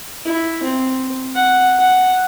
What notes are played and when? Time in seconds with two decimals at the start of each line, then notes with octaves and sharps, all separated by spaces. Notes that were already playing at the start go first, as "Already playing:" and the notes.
0.25 E4
0.63 C4
1.35 F#5
1.79 F#5